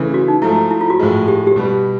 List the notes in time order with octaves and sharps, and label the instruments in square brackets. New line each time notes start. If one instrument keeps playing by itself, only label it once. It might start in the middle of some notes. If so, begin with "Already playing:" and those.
Already playing: [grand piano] C#3 E3 A3
[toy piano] F#4
D#4
[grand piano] G#2 F3 A3 [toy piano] E4
[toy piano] E4
F4
F#4
[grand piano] A2 F3 G#3
[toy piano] G4
G4
[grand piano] B2 G3 B3